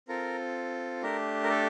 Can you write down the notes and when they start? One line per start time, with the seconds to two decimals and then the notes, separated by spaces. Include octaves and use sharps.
0.08 C4 F4 A4 A#4
1.03 A3 D4 G4 A#4
1.43 A#4
1.50 A4